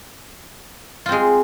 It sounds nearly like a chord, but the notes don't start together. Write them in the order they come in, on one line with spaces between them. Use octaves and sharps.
F4 C4 G#3